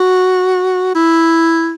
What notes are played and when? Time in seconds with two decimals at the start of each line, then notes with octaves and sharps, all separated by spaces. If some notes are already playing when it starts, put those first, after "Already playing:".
Already playing: F#4
0.95 E4